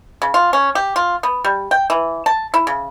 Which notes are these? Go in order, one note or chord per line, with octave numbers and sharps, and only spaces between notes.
C#3
F4
C#4
G4
F4
B3
G3
G5
E3
A5
E4
C#3